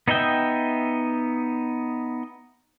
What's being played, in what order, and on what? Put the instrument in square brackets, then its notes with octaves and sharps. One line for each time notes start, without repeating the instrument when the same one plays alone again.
[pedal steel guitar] B3 D#4 D#5 E5 G5